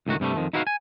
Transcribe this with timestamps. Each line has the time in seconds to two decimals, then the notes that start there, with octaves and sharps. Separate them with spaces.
0.07 C#2 A2 D#3 F#4
0.20 G2 C3 G3 A3
0.36 F2 D#3 F3
0.53 D#4 E4 F#4 B4 C#5 F5
0.67 G#5